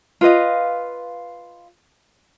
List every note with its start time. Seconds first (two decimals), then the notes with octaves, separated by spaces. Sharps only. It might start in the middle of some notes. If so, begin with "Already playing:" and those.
0.21 F4 B4 D#5 F5